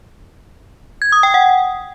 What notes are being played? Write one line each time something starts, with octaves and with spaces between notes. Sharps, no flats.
G#6
D#6
G5
F#5